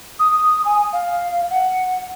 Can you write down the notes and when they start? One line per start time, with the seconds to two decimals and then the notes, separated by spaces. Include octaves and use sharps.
0.19 D#6
0.65 G#5
0.93 F5
1.50 F#5